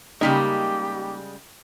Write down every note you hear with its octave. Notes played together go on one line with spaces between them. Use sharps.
C#3 G3 G#3 A#3 D#4 G4